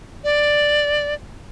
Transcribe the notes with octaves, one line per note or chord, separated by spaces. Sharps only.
D5